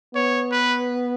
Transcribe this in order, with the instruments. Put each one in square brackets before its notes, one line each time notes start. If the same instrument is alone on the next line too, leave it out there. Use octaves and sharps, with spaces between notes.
[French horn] B3 [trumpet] C#5
[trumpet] B4